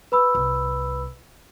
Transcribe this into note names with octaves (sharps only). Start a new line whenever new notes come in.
B4 B5 E6
C2